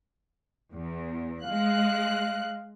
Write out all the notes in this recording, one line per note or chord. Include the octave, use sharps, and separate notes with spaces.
E2
G#3 F5 F#6